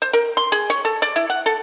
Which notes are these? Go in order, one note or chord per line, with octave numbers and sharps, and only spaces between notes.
C5
A#4
C6
G#4
C#5
A4
D5
E4
F#5
A4